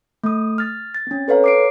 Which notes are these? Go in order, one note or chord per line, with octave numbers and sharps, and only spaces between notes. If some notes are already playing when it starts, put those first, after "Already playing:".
A3 D#6
F6 A6
A6
C4 C#4
A4 B4 C#5 F5 A#5
D6 C7 D7